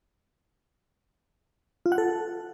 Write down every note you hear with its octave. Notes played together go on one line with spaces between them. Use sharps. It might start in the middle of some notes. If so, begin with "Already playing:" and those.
F4
F#5
A4